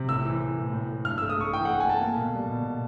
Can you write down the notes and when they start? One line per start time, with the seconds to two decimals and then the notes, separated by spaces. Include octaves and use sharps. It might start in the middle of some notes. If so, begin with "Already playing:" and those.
Already playing: C3
0.09 A2 E6
0.25 E3
0.41 E3
0.58 A2
0.73 A2
0.89 A2
1.05 G2 F6
1.18 E6
1.22 A3
1.29 D#6
1.37 A3 C#6
1.53 E3 G5
1.65 F#5
1.69 A3
1.80 G#5
1.85 A3 A5
2.01 A#3
2.17 B2
2.34 G3
2.49 B2
2.65 B2